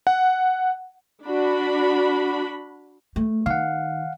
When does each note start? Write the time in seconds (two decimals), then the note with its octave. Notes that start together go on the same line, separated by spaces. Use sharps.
0.07 F#5
1.26 D4 F#4 B5
3.16 A3
3.46 D#3 F5 F#5